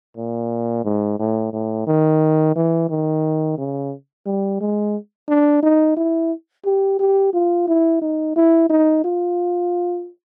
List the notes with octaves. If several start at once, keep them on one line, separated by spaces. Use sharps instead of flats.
A#2
G#2
A2
A2
D#3
E3
D#3
C#3
G3
G#3
D4
D#4
E4
G4
G4
F4
E4
D#4
E4
D#4
F4